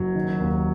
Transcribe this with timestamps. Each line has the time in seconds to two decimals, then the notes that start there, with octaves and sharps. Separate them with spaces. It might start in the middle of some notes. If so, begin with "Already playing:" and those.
Already playing: F#1 F#3
0.15 D#3
0.40 D#2